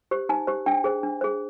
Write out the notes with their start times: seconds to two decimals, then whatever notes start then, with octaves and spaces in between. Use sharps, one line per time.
0.11 G4 C5
0.29 D#4 G#5
0.47 G4 C5
0.66 D4 G5
0.84 G#4 C5
1.03 D4
1.21 G#4 C5